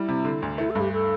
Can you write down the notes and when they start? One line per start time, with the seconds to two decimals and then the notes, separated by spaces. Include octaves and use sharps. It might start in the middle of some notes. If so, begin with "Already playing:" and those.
Already playing: G3 E4
0.08 C3
0.25 D3
0.42 D2
0.58 A3 E4
0.70 A4
0.75 G2
0.81 G4
0.92 A4